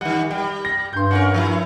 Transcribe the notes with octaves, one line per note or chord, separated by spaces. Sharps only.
D#3 G3 F#5
G3 G5
A#6
G2 C6 G6
C#4 E4 A#4 F#5
F3 E4